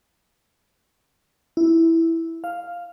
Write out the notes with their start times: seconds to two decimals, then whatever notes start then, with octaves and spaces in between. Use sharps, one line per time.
1.57 E4
2.44 F5